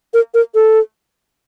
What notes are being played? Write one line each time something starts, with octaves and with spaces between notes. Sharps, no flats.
A#4
A#4
A4